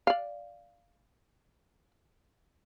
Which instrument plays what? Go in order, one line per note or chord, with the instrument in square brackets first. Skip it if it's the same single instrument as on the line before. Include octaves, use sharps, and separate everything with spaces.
[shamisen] D5 F5